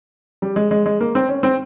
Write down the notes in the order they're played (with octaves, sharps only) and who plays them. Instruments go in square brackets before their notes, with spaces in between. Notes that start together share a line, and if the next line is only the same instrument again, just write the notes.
[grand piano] G3
G#3
G#3
G#3
A#3
C4
C#4
C4